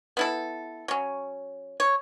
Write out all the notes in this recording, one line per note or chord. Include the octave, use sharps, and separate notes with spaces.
B3 E4 A4
F#3 C#4
C#5